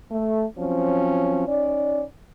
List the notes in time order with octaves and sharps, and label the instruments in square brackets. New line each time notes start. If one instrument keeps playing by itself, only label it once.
[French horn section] A3
F3 F#3 C4 C#4
C#4 D#4 D5